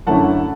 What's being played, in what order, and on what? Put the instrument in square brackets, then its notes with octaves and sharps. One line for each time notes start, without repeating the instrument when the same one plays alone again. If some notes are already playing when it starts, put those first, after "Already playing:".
[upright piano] F#2 D3 A3 C#4 E4 F#5 A5